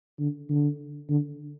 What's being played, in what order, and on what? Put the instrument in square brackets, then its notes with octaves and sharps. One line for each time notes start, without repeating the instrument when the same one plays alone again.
[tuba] D3
D3
D3